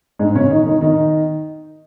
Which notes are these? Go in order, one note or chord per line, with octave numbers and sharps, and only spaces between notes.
G#2 G#3
C#3 C#4
D#3 D#4
D#3 D#4
D#3 D#4